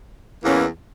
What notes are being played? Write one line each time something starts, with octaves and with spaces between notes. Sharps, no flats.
E2 E3 A#3 C#4